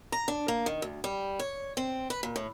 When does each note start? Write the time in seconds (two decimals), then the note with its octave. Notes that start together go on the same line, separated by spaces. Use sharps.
0.12 A#5
0.28 D4
0.48 A#3
0.66 D#3
0.82 D2
1.04 G3
1.39 C#5
1.77 C4
2.10 B4
2.23 A#2
2.36 A2